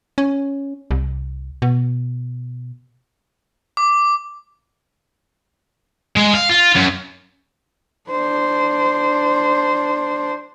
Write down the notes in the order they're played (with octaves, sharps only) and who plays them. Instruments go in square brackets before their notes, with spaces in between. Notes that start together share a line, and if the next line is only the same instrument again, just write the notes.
[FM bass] C#4
C2
B2
[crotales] D6
[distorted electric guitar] G#3
F5
F4
F#2
[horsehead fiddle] D4 C5